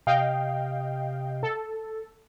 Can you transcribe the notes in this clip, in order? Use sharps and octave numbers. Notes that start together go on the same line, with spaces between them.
C3 D#5 F5 G5
A4